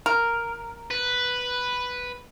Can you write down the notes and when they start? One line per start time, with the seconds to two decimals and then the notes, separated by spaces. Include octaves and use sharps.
0.06 A#4
0.91 B4